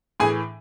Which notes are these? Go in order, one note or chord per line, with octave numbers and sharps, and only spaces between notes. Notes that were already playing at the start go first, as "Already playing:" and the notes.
A2 E3 G#4 G#5